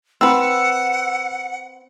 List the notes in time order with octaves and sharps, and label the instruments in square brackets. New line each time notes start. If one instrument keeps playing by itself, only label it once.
[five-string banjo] C4 B4 [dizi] F#5 [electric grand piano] E6